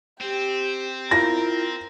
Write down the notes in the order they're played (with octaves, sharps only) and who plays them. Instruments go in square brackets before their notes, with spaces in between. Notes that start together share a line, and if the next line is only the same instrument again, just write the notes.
[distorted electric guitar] C4 [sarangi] G4
[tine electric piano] E4 F4 [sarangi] A#4 [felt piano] A#6